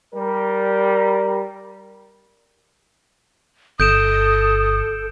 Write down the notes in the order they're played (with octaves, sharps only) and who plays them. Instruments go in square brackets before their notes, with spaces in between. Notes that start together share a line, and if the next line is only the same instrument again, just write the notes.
[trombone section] G3 A#4
[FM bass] G1 [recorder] A4 [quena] D#6 [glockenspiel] G6 D7 E7